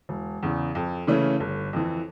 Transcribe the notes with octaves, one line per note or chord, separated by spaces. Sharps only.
E1
E2 C#3
F2
C#3 E3 A3 C#4
G1
F2 E3